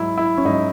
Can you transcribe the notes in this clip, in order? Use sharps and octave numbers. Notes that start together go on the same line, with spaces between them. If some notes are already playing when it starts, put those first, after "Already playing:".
Already playing: G#2 F#3 E4
E4
C#4
G#2 F#3 D#4